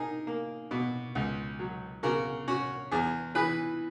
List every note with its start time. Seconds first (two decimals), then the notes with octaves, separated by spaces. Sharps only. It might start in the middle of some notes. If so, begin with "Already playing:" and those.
Already playing: D#4 G#4 A#4
0.27 A#3
0.71 B2
1.15 C#2
1.59 F#3
2.03 C#3 F#4 A#4
2.48 C#4 F#4
2.91 E2 G#4
3.35 E3 G#4 B4